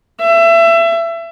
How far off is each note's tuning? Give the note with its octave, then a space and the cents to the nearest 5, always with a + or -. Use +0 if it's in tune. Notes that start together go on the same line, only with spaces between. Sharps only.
E5 +25